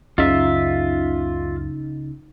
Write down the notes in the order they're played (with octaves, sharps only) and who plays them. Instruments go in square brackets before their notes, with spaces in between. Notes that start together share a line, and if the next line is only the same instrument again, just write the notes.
[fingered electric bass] C#2 F#2 [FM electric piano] C#3 D#4 [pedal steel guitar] F4 E5